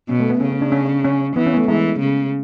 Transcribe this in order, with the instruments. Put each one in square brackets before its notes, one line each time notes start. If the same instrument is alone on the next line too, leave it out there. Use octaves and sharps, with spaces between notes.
[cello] B2 [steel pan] C#4
[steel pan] A3
B3
[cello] C#3 [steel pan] C#4
[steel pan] C#4
D4
C#4
C#4
[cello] E3 [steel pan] B3
[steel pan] C#4
B3
A3
[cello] E3 [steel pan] G#3
[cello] C#3